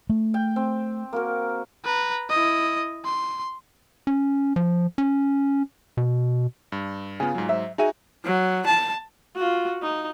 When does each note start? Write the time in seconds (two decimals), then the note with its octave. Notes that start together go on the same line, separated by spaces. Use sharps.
0.09 A3
0.34 G5
0.56 C4
1.13 A#3 F#4 A#4
1.85 B4 A#5
2.30 E4 D#5
3.05 C6
4.07 C#4
4.56 F3
4.98 C#4
5.97 B2
6.72 G2
7.20 C#3 B3 F4 G#5
7.35 G#2 F#3
7.49 C5 E5
7.78 D#4 F#4 G#4 E5 G#5 D#7
8.24 F#3
8.66 A5
9.35 F4 F#4
9.82 D#4